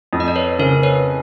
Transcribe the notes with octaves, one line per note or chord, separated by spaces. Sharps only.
F2
D#5
D5
B4 C#5
C#3 A#4 C5
B4 C#5